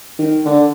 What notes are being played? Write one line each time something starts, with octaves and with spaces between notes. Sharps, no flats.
D#3
D3